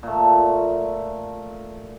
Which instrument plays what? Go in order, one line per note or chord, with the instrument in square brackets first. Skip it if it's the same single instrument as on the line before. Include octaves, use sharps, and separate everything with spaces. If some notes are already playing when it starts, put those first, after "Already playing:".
[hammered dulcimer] A#2 A3